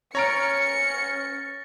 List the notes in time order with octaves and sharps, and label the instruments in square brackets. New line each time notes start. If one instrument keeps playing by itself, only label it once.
[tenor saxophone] C#4 [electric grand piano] C#5 A#5 D7 [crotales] F6 A6 A#6 [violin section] C#7